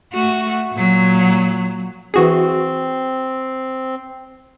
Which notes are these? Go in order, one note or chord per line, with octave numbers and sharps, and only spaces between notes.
A3 F#4
A#2 F#3
E3 C4 F#4 G#4